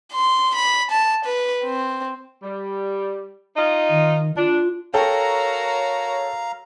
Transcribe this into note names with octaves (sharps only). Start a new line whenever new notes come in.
C6
B5
A5
B4
C4
G3
D#4 F4 D#5
D#3
D4 F4
F#4 A4 A#4 C#5 F5 G5 A#5